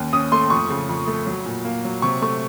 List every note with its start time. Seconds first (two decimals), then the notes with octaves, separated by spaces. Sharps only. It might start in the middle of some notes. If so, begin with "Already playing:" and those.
Already playing: D#2 C#4
0.13 C#4 D#6
0.32 A3 C6
0.50 F2 C#6
0.70 C#3
0.89 F2
1.07 A3
1.27 F#3
1.46 A#2
1.65 A#3
1.85 F#3
2.02 C3 C#6
2.22 A3 C#6